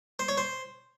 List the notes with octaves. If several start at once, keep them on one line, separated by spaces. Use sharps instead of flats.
C5
C#5
C5